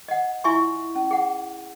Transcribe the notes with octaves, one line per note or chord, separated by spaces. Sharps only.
D#5 F#5
E4 F4 E5 G#5 C6 C#6
C#4
G#4 F#5